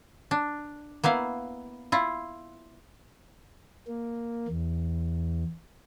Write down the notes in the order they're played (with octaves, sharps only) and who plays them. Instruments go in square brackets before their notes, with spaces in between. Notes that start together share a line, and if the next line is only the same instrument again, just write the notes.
[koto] D4
A#3 B3 E4 F5
E4 F4
[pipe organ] A#3
E2